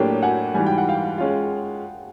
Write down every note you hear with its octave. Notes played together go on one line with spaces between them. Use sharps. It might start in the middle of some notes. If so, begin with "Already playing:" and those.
Already playing: A2 F#3 A#3 D4 G4 G5
F#5 G#5
G#2 E3 G3 G#5
G5
F#5
F5 G5
G#3 C#4 F4